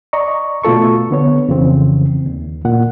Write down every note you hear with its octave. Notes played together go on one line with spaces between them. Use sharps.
D5 D#5 A#5 C#6
B2 A3 F4 A4 C#6
D3 B3 C#5
F2 C#3 E3 C4
D#2
A#2 F#5